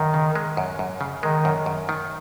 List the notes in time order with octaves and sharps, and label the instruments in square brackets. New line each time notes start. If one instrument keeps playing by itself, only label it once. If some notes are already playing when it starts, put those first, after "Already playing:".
Already playing: [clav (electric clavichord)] F#2 [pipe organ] D#3
[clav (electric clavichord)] C#3
G#3
F#2
F#2
C#3
[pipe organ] D#3 [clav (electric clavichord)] G#3
[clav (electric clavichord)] F#2
F#2
D#3